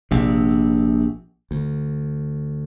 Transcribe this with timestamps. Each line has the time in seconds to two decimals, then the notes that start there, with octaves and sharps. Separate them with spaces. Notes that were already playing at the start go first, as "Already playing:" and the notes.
0.11 A#1 C3
1.51 D2